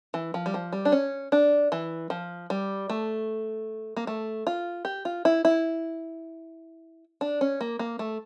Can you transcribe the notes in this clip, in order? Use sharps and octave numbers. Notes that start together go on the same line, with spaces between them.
E3
F3
G3
F3
G3
D4
C#4
D4
E3
F3
G3
A3
A#3
A3
F4
G4
F4
E4
E4
D4
C#4
A#3
A#3
A3